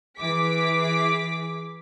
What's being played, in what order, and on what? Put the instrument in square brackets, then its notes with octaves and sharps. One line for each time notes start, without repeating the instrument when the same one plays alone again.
[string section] E3 G#4 D6 B6